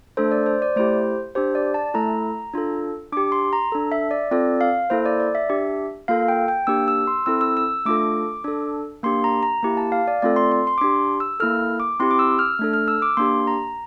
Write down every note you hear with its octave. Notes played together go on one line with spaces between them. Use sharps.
A3 D4 A4 C5
D5
C5
D5
A3 E4 G4 C5
D4 G4 C5
D5
A5
A3 E4 A4 A#5
D4 F4 A4
D4 G4 D6
C6
A#5
D4 A4
E5
D5
C4 F4 A4 D5
F5
A#3 E4 A4 C5
D5
D5
E5
D4 G4
A#3 F4 A4 F5
G5
G5
A#3 D4 G4 E6
E6
C6
C4 E4 A4 E6
E6
E6
A3 D4 F4 A4 D6
D4 A4
A#3 D4 G4 C6
A#5
A#5
A#3 E4 G4
A5
F5
D5
A3 C4 F4 A4 D5
C6
C6
C6
D6
D4 G4 C6
E6
A#3 E4 A4 F6
D6
C4 E4 G4 C6
D6
E6
F6
A3 D4 A4
F6
E6
D6
A#3 D4 G4 C6
A#5